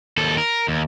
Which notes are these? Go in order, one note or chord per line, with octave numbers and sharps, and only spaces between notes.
D#2 A4
A#4
D#2